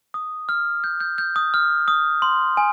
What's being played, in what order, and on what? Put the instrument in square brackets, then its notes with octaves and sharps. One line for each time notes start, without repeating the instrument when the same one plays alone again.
[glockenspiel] D#6
F6
G6
G6
G6
D#6
F6
D#6
C6
G#5